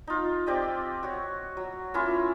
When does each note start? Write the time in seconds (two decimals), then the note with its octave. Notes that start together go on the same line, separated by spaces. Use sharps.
0.07 D#4 F4
0.46 C4 G4 D5 D#5
1.03 F#4 C#5
1.57 F#3
1.94 A#3 C#4 E4 F4